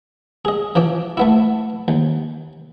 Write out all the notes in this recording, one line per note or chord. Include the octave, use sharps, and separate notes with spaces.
G#4 D#5
E3 F3 D6
A3 B3 E4
D#2